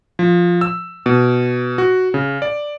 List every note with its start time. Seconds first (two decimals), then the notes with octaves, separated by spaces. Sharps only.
0.19 F3
0.61 E6
1.06 B2
1.78 F#4
2.14 C#3
2.42 D5